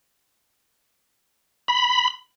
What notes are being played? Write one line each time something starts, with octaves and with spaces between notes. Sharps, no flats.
B5